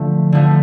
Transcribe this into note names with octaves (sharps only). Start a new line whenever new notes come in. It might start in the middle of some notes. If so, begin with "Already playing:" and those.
Already playing: D3 F3 A3
D3 F3 A3